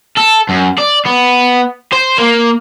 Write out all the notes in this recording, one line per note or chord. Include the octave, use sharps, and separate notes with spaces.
A4
F#2
D5
B3
C5
A#3